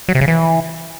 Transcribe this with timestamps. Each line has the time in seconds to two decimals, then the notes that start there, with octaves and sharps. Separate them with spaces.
0.08 F#3
0.15 C3
0.21 C#3
0.28 E3